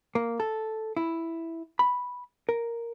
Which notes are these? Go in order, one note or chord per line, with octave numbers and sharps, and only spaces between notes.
A#3
A4
E4
B5
A#4